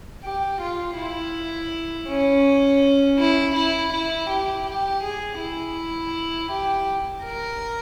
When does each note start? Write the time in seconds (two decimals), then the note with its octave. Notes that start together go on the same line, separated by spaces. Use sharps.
0.24 G4
0.61 F4
0.97 E4
2.08 C#4
3.19 E4
3.55 E4
3.93 E4
4.30 G4
4.67 G4
5.03 G#4
5.40 E4
6.51 G4
7.24 A#4